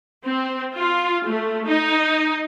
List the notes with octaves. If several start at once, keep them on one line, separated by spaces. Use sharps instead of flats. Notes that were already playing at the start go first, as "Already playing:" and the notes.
C4
F4
A3
D#4